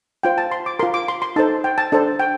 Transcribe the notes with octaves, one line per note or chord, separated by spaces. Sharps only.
F4 C5 G5
A5
C6
D6
F4 A#4 C6
D6
C6
C6
D#4 A4 C5 A5
G5
A5
D4 A4 C5
G5